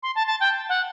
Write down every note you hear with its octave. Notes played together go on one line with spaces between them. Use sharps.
C6
A5
A5
G5
F#5